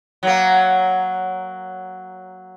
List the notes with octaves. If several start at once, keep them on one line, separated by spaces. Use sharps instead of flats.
F#3 A#3